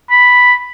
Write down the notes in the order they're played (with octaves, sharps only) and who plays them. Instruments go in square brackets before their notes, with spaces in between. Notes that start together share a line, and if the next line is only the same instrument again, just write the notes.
[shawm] B5